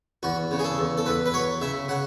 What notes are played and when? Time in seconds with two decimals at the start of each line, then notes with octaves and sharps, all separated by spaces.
0.23 E2 F#4
0.51 C#3
0.59 G#4
0.64 A4
0.78 E2
0.97 A4
1.06 E2 B4
1.26 B4
1.34 F#3 C#5
1.61 C#3 E5
1.89 C#3 F#5